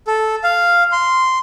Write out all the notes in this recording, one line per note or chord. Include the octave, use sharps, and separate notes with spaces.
A4
F5
C6